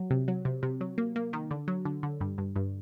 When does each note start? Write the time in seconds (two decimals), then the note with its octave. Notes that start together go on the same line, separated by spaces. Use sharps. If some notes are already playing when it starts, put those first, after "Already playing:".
Already playing: F#3
0.10 C3
0.28 F#3
0.45 C3
0.63 C3
0.81 F#3
0.98 A#3
1.16 A#3
1.33 D#3
1.51 D3
1.68 F#3
1.85 D3
2.03 D3
2.21 G2
2.38 G2
2.56 G2